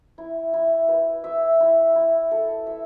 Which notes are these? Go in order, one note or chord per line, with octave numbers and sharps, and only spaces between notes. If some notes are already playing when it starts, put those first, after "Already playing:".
E4
E4
B4
E5
E4
E4
A4
E5